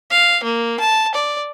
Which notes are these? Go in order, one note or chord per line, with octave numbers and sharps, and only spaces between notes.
F5
A#3
A5
D5